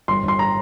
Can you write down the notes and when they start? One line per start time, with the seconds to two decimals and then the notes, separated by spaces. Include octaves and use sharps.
0.08 G1 C6
0.23 G1
0.28 C6
0.39 A#5